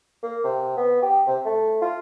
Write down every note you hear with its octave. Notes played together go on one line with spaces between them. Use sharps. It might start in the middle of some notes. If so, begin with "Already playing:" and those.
A#3
C3
B3
G4
C3
A3
F4